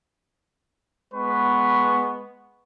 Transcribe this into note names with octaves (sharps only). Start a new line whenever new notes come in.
G#3 B3 B4 C#6